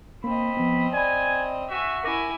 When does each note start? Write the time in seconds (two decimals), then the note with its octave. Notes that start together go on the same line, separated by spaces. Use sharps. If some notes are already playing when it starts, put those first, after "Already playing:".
0.24 A#3 C4 D#5 B5
0.57 F3 B3
0.93 D5 G#5 B5
1.70 F#4 E5 G#5
2.04 E4 A#4 G#5 D6 A#6